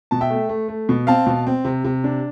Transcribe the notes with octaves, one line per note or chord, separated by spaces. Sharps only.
B2 A5
E5 G5
A3
A3
A3
B2
C4 F5 A5
B2
C4
C3
C3
D4